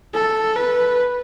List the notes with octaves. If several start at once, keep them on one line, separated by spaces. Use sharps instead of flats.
A4
B4